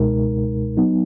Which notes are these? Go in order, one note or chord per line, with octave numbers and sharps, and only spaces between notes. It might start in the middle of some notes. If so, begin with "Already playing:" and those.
Already playing: C#2 B2 G#3 D#4 A#4
F#3 B3 D#4